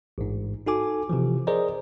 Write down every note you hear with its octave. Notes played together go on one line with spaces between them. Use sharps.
A1 G#2
D#4 F#4 A4 G#5 D6
C3 E3 F3
G#4 A#4 C5 D5 D#5 A#5